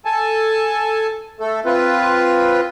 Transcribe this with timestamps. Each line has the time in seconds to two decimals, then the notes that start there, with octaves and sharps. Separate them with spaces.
0.05 A4 G#5 A5
1.40 A3 A4
1.66 C4 F4 B4